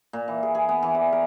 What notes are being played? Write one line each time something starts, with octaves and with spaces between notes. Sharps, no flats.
A#2
E3
G#4
G#4
B3
E3
D5
A#4